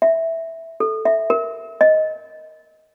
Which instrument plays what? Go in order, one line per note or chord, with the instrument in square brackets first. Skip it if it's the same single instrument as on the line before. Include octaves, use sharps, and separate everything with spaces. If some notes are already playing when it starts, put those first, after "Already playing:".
[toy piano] E5
A4
E5
A#4
D#5